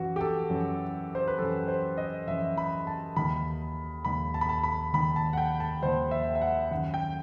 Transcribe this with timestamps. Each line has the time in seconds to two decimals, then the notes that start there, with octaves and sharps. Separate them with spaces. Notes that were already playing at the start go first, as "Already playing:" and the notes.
Already playing: F#2 E3 F#4
0.16 G4
0.21 A4
0.50 F#2 E3
1.15 C5
1.28 B4
1.38 F#2 E3 A4
1.68 C5
1.97 D#5
2.27 F#2 E3 E5
2.58 B5
2.87 A5
3.16 D#2 D#3 B5
4.05 D#2 D#3 B5
4.34 A5
4.41 B5
4.49 A5
4.64 B5
4.94 D#2 D#3 B5
5.16 A5
5.33 F#5
5.37 G5
5.60 A5
5.82 D#2 D#3 C5
6.11 E5
6.35 E5
6.41 F#5
6.71 D#3 F#5
6.74 F#2
6.94 G5